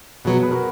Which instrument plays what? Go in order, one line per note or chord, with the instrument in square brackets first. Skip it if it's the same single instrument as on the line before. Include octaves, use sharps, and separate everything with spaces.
[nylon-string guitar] B2 F#3 B3 [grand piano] G#4 B4
[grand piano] G#4 B4
F#4 A#4